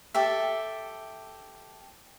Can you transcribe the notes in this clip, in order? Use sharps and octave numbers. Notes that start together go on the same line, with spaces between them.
G4 A4 E5